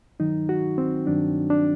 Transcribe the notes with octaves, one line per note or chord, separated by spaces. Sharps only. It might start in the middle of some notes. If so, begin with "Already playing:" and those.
G2 D#3 F#3 D#4
F#4
C4
G2 D#3 F#3 D4
D4